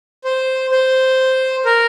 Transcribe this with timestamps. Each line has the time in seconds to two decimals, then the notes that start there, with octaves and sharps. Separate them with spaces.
0.24 C5
0.71 C5
1.65 A#4